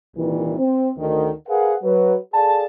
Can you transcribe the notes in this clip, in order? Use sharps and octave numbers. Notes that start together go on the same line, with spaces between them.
C2 A#2 D#3 E3
C4
D2 D3 D#3
G#4 A#4 B4 F5 F#5
F#3 B4
G#4 A4 D5 F5 A5